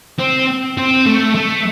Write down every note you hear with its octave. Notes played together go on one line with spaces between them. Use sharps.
C4
C4
A3
A3